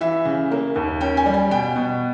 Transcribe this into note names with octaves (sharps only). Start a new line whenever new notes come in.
E3 E5
C#3
A#3
D#2
C#4 G5
G#5
G3
G#5
B2 G5
B2